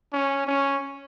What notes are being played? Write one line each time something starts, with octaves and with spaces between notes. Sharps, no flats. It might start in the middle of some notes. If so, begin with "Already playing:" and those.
C#4
C#4